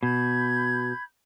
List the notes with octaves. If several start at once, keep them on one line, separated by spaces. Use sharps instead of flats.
B2 B5 G6 G#6